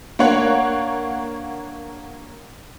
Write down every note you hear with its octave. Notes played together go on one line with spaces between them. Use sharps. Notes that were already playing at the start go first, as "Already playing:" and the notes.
A#3 D4 C#5 F#5